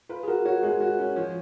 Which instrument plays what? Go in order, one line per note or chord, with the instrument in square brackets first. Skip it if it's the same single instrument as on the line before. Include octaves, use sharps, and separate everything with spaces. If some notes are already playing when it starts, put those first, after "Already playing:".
[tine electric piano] F4 [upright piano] B4
[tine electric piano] G#4
[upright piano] F#4 [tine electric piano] A#4
[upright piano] F#4 [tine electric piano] C#5
[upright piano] G#3
F#4
C#4
[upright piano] F3 [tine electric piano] C#5